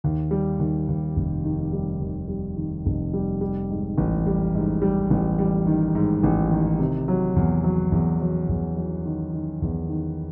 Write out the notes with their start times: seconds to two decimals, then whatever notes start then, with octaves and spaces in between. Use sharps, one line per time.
0.04 D#2
0.31 G3
0.59 D#2
0.88 D#2
1.16 F1
1.44 D#3
1.73 G3
2.01 D#2
2.28 G3
2.56 D#3
2.86 F1
3.14 G3
3.41 G3
3.70 G#2
3.98 A1
4.27 G3
4.55 G#2
4.82 G3
5.10 A1
5.39 G3
5.67 D#3
5.95 G#2
6.23 A1
6.51 D#3
6.79 C3
7.08 F#3
7.36 E2
7.64 F#3
7.92 E2
8.20 F#3
8.49 E2
8.77 F#3
9.05 D#3
9.34 D#3
9.62 E2
9.89 D#3